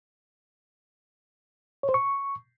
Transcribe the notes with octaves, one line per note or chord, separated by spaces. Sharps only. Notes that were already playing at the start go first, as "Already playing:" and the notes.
C#5
C5
C#6